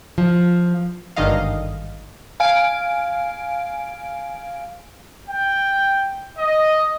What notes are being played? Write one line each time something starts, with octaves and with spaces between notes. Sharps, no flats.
F3
G#1 G2 D3 D#3 D#5 F5
F5 G#5 D7
G5
D#5